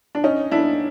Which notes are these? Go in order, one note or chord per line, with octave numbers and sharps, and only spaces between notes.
D4
C#4 D#4
D4 E4